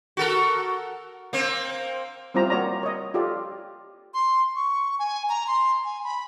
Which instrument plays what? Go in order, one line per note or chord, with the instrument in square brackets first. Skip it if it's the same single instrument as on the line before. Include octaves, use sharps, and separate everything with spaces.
[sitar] F#4 A4 A#4
A#3 C4
[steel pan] G3 C4 E4 F4 C5 A#5
A#3 F#4 C#5 D5 A#5
C#5 D#5
F4 G4 A4 D5
[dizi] C6
C#6
G#5
A#5
C6
G#5
B5